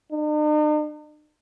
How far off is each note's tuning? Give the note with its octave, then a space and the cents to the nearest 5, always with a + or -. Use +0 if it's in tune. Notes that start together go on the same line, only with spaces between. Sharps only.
D#4 -45